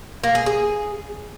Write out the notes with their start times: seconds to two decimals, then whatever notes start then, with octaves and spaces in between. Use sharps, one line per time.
0.24 A#3
0.35 G#4
0.46 G#4